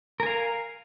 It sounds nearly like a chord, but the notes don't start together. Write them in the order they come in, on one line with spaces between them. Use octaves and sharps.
A#4 G#5 F5